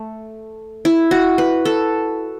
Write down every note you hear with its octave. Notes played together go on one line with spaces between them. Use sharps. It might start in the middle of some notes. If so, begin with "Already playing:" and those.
Already playing: A3
E4
F#4
B4
A4